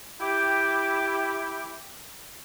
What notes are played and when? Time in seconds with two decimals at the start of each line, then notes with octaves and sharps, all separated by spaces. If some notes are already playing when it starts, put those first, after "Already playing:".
0.21 E4 G4 G5 D6